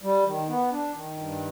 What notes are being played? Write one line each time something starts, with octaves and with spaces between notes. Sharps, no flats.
G3
D#3
B3
D4
D#3
G2